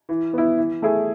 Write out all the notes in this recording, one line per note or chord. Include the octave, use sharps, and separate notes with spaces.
E3
B3 E4
E3
A3 E4 G#4